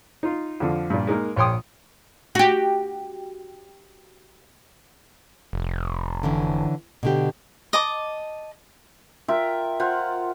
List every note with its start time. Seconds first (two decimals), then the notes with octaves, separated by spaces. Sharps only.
0.23 D#4 F4
0.60 F2 D3 F3
0.90 G2 A#2
1.07 G#3 A#3 D#4 A#4
1.36 A#1 C#5 G5 C6 D#6
2.35 F#4 G4
5.53 F1
6.23 D3 E3 C#4
7.03 B2 D3 G4
7.73 D#5 A5 D6
9.28 F4 A#4 E5 G5
9.80 F4 C5 F#5